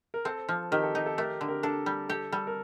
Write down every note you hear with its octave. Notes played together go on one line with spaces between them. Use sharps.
A#4
C4 A4
F3
D#3 G4 A#4
A4
D#4 G4
A4
A3 G4 A#4
D3
G4 A#4
D4 A4
G3
G4 A4
G3 A4
A#4